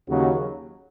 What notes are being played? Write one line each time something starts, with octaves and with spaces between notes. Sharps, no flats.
D#2 C#3 F#3